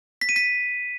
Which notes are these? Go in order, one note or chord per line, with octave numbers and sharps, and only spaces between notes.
B6
D#7
B6